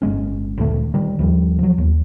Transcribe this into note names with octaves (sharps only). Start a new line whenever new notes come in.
G1 G#3 C#4
D2 A#2 D#3 A3
D#3 G3
D#2 F3 G3
F3 F#3
D#2